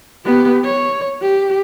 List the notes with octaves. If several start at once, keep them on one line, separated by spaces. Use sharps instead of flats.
B3 G4
C#5
G4